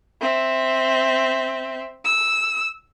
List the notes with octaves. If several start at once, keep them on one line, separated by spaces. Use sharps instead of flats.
C4 E5
E6